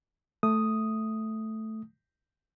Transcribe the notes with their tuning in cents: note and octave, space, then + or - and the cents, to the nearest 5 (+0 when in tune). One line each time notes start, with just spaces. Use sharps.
A3 +0 D#6 +0